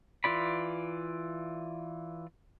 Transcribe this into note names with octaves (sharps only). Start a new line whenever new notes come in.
E3 F4 D5 B5